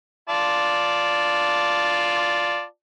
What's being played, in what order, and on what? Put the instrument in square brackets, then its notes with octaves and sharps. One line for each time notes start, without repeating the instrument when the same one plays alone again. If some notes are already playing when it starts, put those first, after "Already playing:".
[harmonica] F4 D5 A5